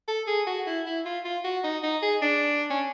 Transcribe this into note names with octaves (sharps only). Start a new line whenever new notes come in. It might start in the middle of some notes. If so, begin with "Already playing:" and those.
A4
G#4
F#4
E4
E4
F4
F4
F#4
D#4
D#4
G#4
D4
C#4